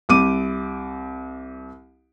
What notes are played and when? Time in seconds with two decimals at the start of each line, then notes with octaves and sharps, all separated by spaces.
0.09 C2 D6 D#7